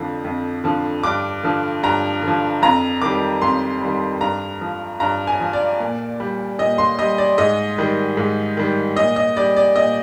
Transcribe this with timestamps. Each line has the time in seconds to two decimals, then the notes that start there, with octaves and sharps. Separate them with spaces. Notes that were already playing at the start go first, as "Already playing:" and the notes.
Already playing: F2 D3 F3
0.24 F2
0.64 D3 F3
1.03 G2 D6
1.43 D3 F3
1.83 G2 A#5
2.22 D3
2.28 F3
2.62 F2 A#5
3.02 D#3 G3 D6
3.42 F2 C6
3.82 D#3 G3
4.21 G2 A#5
4.61 F3
5.00 G2 A#5
5.27 G#5
5.40 F3
5.53 D5
5.80 A#2
6.20 G3
6.59 A#2 D#5
6.78 C6
6.99 G3 D#5
7.18 D5
7.38 G#2 D#5
7.78 D#3 G3
8.17 G#2
8.57 D#3 G3
8.97 A#2 D#5
9.16 D#5
9.37 G3 D5
9.57 D5
9.76 A#2 D#5